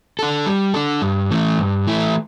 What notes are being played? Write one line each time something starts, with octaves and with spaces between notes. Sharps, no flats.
D4 A4
G3
D4 A4
G2
E3 A3 E4
G2
E3 A3 E4